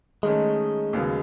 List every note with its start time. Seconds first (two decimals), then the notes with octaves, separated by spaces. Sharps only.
0.23 D#3 G#3 A3 C#4
0.93 D#2 C#3 F#3 B3